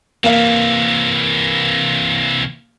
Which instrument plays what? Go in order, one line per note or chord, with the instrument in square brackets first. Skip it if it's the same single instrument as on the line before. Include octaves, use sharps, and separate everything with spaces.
[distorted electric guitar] C3 E3 [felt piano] A#3 F5